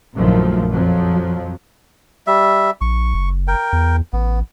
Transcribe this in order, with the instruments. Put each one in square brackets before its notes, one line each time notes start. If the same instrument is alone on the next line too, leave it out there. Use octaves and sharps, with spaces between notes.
[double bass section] A#1 F#2 D#3 F3 A3
F2 F3 F#3
[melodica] G3 E5
[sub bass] A#1 [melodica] C#6
[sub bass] F#1
[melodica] A#4 G5
[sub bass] E2
[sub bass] A1 [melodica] B3